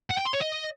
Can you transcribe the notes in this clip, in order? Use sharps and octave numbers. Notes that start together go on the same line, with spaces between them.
F#5
G5
C6
C#5
D#5